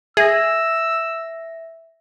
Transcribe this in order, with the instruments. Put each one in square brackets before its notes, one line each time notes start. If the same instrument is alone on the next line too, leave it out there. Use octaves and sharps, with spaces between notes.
[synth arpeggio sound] G#4 [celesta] E5 A#6 [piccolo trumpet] E6